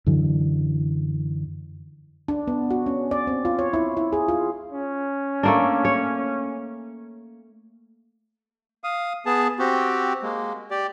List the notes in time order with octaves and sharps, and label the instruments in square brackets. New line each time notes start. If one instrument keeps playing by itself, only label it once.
[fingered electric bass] F#2 D3 E3
[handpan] D4
B3
F#4
C#4
D5
C4
F4
C#5
E4
E4
G#4
F4
[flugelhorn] C#4
[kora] A3 A#3 D4
C#5
[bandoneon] F5 D#6
B3 G#4 A5
C4 F#4 G4
G#3 A#3
G4 D5